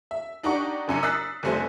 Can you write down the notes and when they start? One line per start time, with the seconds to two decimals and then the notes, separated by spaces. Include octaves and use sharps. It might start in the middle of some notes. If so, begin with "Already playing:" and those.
0.11 E5
0.43 D4 D#4 G4 D5 F#5 C#6
0.88 F#1 F#2 G#5 C#7
1.03 D#6 E6 F#6 A6 B6 C7
1.43 F1 F2 G3 A3 C5 G#5